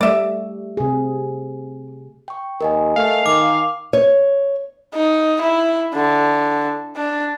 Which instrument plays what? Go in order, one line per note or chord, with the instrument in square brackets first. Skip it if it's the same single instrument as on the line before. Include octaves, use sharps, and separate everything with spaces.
[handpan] G3 A3 [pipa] D5 E5
[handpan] C3 G#4
[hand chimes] G5 C#6
[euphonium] D#2 [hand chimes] A#4 D#5 G#5
[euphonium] A3 [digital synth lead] F5
[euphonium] D#3 [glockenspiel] D6
[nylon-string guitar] C#5
[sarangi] D#4
E4
D3
D4